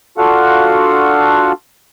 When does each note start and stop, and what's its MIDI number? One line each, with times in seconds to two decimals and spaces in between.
0.18 1.52 62
0.18 1.52 65
0.18 1.52 66
0.18 1.52 69
0.18 1.52 77
0.18 1.52 78